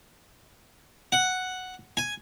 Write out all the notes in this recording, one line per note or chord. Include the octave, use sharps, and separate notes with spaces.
F#5
G#5